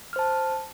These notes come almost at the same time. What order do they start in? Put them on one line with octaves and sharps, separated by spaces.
F6 C5 A5